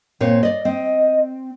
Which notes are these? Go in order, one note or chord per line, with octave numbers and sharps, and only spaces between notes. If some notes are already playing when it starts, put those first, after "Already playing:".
A#2 C4 C#5
D5 D#5
C4 D#5